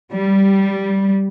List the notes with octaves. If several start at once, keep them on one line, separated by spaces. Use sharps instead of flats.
G3